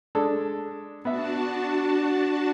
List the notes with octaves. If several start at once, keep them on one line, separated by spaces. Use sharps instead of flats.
G#3 D4 A4
B3 D4 F#4 E5 A5